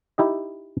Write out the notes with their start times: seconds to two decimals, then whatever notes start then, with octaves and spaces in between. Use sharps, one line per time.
0.18 D#4 E4 G4 D#5